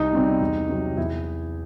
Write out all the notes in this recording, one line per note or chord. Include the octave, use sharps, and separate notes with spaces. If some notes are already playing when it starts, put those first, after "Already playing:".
Already playing: C2 D#4
B2 G3 C4
E2
C3 F#3 C4
E2 E4